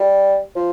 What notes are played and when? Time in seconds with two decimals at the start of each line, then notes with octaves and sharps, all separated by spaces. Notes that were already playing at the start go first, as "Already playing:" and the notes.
Already playing: G3
0.56 F3